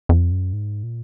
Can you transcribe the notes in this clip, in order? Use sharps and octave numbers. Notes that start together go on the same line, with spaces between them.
F2
F#2
G#2
A#2